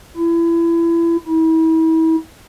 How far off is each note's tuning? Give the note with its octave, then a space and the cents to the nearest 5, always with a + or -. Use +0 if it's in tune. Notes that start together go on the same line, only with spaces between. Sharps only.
E4 +30
E4 -35